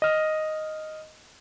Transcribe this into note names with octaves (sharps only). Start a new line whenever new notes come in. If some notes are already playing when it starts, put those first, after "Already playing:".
D#5 F6